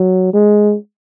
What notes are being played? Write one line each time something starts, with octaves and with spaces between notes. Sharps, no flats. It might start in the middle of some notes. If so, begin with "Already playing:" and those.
Already playing: F#3
G#3